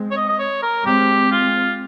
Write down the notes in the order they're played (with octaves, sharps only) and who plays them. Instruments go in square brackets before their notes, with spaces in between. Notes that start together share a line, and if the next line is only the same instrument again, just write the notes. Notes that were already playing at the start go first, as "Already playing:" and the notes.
Already playing: [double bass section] G#3 C4
[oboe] C#5
D#5
D#5
C#5
A#4
[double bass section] G#3 C4 [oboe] G4
[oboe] F4